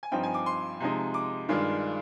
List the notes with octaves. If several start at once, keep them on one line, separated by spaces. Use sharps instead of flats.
G#5
G2 F3 C4 D#4 G5
G#5
D6
C6
C3 F3 G#3 D#4
D6
G2 D#3 G#3 D4 F4